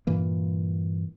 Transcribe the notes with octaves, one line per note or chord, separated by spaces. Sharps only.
G2 A#2 E3 A#3